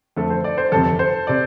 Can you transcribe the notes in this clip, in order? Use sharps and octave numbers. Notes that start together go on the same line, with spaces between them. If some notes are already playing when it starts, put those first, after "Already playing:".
F2 D3 A3 A4
C5
D5
C5
G1 F2 C3 A4
C5
C3 D5